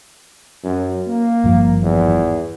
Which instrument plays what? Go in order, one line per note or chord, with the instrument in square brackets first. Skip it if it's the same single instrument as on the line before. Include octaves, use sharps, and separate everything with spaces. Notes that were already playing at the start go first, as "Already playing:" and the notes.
[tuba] F#2
A#3
[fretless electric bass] G#1 G2 F3
[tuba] E2